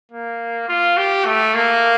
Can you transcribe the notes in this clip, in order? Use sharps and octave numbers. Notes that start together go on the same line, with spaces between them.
A#3
F4
G4
A3
A#3